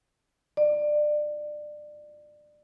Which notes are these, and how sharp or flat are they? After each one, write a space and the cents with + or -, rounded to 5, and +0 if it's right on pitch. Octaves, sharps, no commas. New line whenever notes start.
D5 +25